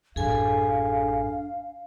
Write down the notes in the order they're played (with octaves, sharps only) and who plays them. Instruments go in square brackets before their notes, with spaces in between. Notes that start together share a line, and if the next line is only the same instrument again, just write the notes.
[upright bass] A1 F#2 [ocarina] D4 [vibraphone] G#4 A4 G#5 [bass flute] F5